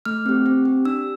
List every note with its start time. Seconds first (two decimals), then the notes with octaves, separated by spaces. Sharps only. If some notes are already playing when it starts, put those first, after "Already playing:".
0.05 A3 F6
0.26 C4 G4
0.46 C4
0.65 G4
0.85 D4 E6